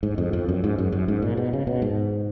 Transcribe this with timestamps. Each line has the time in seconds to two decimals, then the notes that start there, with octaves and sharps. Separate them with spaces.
0.03 G#2
0.18 F2
0.33 F2
0.49 F#2
0.64 G#2
0.78 F#2
0.92 F#2
1.08 G#2
1.22 A#2
1.37 B2
1.53 C#3
1.67 B2
1.82 G#2